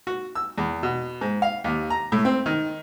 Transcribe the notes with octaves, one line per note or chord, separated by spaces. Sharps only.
F#4
E6
E2
B2
G#2
F5
D#2
A#5
A2
C4
D#3